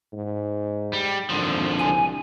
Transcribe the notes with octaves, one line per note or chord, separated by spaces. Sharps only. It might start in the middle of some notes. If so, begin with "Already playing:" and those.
G#2
G3
G#1 D3 F3
C2 G#5